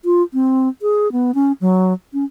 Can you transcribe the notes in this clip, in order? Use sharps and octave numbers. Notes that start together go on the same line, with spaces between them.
F4
C4
G#4
B3
C#4
F#3
C#4